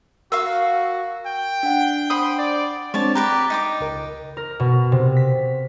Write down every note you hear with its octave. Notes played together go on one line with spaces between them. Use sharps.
F#4 A#4 F5 C#6 E6
G5
D4 F#5
C5 B5 D#6
D5
G#3 C4 D4 C#5 D5 A5
G4 B4 D5 A#5
D#4 G5 D6
C#2 A#4
A#4
B2
C3
B6